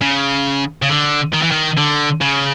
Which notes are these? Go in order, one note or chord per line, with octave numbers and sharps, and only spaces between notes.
C#3
C#3
D3
D#3
E3
D#3
D3
C#3